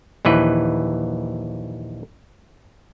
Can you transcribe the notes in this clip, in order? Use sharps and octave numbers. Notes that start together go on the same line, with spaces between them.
A#1 D#2 E3 B4